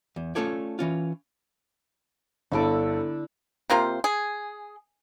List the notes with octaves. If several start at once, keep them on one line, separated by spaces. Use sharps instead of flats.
E2
A3 C#4 F4 A4 C#5 D5
E3 C#4 F4
G1 D3 E4 A4 D6
C3 A#3 F4 C5
G#4